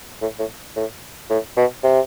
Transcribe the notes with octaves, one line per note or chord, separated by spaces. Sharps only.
A2
A2
A2
A2
B2
C3